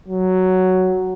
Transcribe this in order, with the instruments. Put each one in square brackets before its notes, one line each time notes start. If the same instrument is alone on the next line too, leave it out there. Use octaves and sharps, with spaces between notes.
[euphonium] F#3